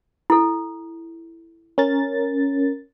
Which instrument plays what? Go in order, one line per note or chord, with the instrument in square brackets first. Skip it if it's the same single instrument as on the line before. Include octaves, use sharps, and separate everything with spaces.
[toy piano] E4 A4
[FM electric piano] C#4 A#4 A6